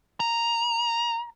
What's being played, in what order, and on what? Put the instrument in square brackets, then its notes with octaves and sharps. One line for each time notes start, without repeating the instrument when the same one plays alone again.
[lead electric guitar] A#5